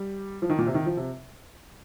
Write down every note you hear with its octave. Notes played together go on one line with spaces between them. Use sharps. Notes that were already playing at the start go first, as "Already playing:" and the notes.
Already playing: G3
F3
D#3
A#2
C3
D#3
F3
C3